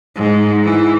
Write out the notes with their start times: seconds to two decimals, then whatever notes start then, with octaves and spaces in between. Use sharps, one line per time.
0.16 G#2
0.64 E3